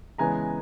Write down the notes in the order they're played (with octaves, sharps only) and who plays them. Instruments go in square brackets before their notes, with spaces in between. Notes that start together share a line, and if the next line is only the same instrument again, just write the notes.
[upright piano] C#3 E3 G#3 B3 G#5 A#5